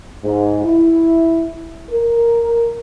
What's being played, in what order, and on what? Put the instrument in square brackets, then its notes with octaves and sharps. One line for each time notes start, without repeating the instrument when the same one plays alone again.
[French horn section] G#2
E4
A#4